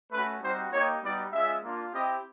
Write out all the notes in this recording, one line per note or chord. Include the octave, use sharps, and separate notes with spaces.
A3 C#4 F#4 B4
G3 C4 D#4 F#4 C5
A#3 D#4 G4 C#5
G3 B3 D#4 F#4 D5
G#3 C#4 F4 E5
A#3 D4 F4
C4 E4 G4 D#5